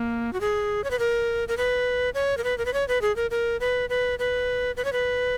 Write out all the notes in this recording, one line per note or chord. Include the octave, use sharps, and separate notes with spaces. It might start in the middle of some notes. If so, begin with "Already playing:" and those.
Already playing: A#3
F#4
G#4
C#5
B4
A#4
A#4
B4
C#5
A#4
B4
A#4
B4
C#5
B4
G#4
A#4
A#4
B4
B4
B4
B4
C#5
B4